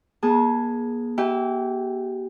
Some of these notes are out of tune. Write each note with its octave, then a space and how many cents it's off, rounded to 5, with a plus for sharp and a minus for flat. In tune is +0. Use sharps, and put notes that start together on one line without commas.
A#3 +45 G#4 +0 A5 +0
G4 -35 E5 -5 G5 +45